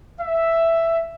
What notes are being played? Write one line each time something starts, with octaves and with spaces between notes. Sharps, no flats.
E5